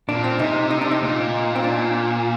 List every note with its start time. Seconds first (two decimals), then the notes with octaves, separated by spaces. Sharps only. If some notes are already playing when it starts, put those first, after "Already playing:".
0.09 A#2 D4
0.24 C4
0.39 C3 D#4
0.71 D#4
0.81 D4
0.91 D#4
1.02 A#2
1.55 C4
1.64 D4